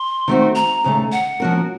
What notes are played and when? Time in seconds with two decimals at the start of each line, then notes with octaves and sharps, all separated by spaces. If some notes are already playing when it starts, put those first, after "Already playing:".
Already playing: C6
0.28 D#3 A3 C4 F#4
0.55 A#5
0.84 D#2 C#3 A3
1.12 F#5
1.40 F3 A#3 C#4 F#4 A#4